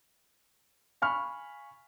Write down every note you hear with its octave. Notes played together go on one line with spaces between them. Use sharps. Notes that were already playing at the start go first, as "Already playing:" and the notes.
F5 G#5 B5 C#6 F6